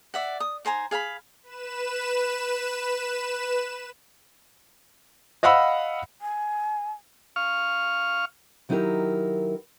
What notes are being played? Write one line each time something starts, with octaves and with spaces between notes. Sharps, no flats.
D5 E5 F#5
D#6
D#4 C5 G#5 A#5
G#4 F5 G5 B5
B4 E7
D#5 F5 F#5 B5 E6
G#5
F5 C#6 F6
D#3 F#3 D#4 E4 G4 A#4